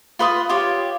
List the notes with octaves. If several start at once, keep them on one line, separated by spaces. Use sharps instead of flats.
F4 B4 C6 D#6
F4 G4 C#5